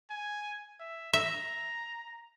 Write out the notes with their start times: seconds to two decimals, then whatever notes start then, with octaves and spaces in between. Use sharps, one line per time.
0.11 G#5
0.80 E5
1.13 E5 A#5